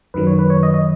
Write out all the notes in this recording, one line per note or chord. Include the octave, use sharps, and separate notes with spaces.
F#2 D#3 F#3 B4
C#5
B4
C#5
D#5
D#5